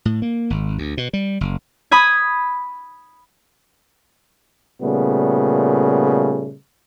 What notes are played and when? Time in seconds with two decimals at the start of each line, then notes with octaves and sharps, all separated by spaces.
0.05 A2
0.22 A#3
0.50 G#1
0.78 D2
0.97 B2
1.13 G3
1.41 F#1
1.91 B5 D#6 G#6
4.82 A#2 C#3 G3 A3 B3